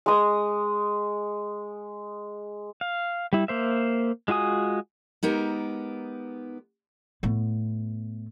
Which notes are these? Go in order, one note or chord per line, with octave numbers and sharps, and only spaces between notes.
G#3 D#6
F5
G3 E4
A#3 C5 E5
G#3 F4 F#4 G#5 D#6
G#3 B3 D#4 G4 A#4
A2 B3